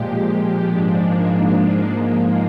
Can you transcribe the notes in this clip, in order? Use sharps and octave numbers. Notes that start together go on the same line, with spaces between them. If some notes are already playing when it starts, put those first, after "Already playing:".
Already playing: A#2 F3 G#3 G4
G#2 F3 G#3 D4
A#3
A#3
G#2 F3 G#3